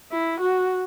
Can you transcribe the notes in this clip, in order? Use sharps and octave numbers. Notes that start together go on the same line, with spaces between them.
E4
F#4